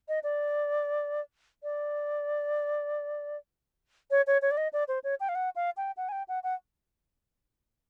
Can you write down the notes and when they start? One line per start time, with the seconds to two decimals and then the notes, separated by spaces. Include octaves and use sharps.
0.08 D#5
0.23 D5
1.63 D5
4.11 C#5
4.27 C#5
4.42 C#5
4.51 D5
4.57 D#5
4.73 D5
4.88 C5
5.04 C#5
5.20 G5
5.29 F5
5.35 F#5
5.56 F5
5.77 G5
5.97 F#5
6.09 G#5
6.12 G5
6.28 F#5
6.43 F#5